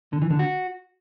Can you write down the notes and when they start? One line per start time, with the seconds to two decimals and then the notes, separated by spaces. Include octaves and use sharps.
0.13 D3
0.22 E3
0.31 D3
0.39 F#4